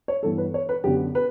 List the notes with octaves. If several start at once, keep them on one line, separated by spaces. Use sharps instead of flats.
C#5
G2 E3 B3 A4
B4
C#5
B4
F#2 D3 F#3 B3 G4
B4